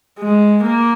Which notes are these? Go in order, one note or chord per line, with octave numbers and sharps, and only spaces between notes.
G#3
A#3